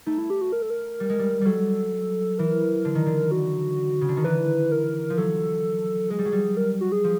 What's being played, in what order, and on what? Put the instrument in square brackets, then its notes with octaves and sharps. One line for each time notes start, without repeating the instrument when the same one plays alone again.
[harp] A3 [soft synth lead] D#4
[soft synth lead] E4
G4
F#4
A#4
A4
A#4
[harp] G3
G#3
G3
[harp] F#3 G3 [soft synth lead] A4
[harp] E3 [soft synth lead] A#4
[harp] D3
D#3
D3
[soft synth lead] F#4
[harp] C#3
D3
D#3
[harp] E3 [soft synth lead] B4
[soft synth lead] A#4
[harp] F3
[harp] F#3 [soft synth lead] A4
[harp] G#3 [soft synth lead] G#4
[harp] G3
F#3
G3
[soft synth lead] A#4
F#4
G#4
[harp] F3